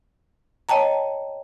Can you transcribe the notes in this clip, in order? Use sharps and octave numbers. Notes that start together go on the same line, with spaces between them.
C#5 D#5 G5 A5 A#5